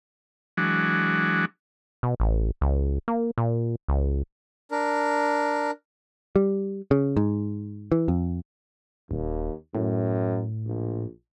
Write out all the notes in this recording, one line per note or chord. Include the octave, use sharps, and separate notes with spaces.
E3 F#3 G#3 D4 F#4
B2
A1
C#2
A#3
A#2
C#2
D4 A#4
G3
C#3
G#2
E3
F2
D#1 D#2
F#2 A2
A#1